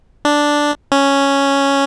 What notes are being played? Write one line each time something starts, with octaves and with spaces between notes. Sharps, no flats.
D4
C#4